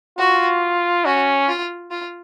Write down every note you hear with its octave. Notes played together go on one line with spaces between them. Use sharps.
F4 F#4
C#4 F#4
F4
F4